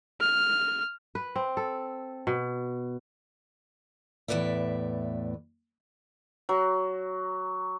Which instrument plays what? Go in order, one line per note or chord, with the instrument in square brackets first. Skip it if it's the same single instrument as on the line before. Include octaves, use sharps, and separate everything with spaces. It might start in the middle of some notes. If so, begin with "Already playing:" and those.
[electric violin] F6
[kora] B4
C4
A4
B2
[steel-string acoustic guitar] E2 A2 B4 D5 E5
[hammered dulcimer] F#3